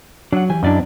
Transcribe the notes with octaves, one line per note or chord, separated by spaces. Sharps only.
F#3 D4 F#5
E3 G4 G#5
F#2 D4 E4 D5 D#5